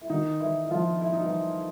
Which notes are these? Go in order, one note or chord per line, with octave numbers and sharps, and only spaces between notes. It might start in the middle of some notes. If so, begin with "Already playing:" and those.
E4
D#3 D#4
E3 E4
E4
F3 F4
E4
D#4
E3 E4